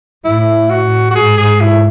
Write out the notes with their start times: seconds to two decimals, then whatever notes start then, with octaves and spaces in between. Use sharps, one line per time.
0.24 A2 E4
0.70 F#4
1.11 F#4
1.15 G#2 G#4
1.38 G#4
1.61 E4